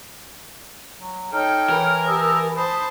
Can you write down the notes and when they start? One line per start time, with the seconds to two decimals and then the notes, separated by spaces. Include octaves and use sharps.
0.99 F#3
1.33 D#4 A4 C#5 G5 F6
1.70 E3 A#4
2.07 G4 A5 D#6 E6
2.57 C5 A5 B5 D#6